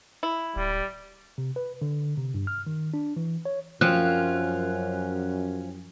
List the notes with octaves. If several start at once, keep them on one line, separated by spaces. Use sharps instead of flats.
E4
D1 G3
C3
B4
D3
C3
G2
F6
D#3
D4
E3
C#5
F#2 F3 C4 C#4 F4 F#6